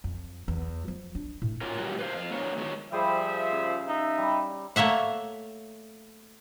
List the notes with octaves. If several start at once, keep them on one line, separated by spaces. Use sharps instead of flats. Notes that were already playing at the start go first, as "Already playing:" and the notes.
F2
E2
F3
D4
A2
A#3 C#4 F4 F#4 A#4
A#2 F#3 G3 A#3 F#4
B4 C5 F5
F2 F5
A#3 B3 D4 F#4 C#5
D3 D#3 G#3 F#4 C#5
F3 G3 G#4 C5 E5 G5
C#3
D#4 E5
G3
A3 A#3 C#5 E5 F#5